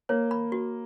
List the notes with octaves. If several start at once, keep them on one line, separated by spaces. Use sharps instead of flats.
A#3 C#5
B5
F#4